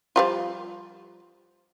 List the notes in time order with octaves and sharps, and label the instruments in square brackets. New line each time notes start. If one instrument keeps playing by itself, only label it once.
[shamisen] F3 G3 F4